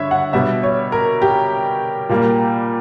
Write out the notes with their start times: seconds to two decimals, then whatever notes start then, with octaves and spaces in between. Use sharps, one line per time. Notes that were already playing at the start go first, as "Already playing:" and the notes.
Already playing: G2 D3 C#5 E5
0.11 F#5
0.33 B2 G3 B3 E5
0.63 C#5
0.92 A#4
1.22 G4
2.09 A#2 G3 A#3